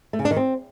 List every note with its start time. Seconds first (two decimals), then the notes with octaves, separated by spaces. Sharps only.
0.13 A3
0.19 C#3
0.25 D4
0.31 D#3
0.36 C4